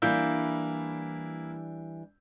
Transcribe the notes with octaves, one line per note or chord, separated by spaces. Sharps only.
E3 G3 A#3 D4 E4 G6